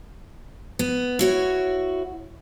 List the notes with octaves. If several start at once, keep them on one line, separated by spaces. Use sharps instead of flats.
B3
E4 F#4 C#5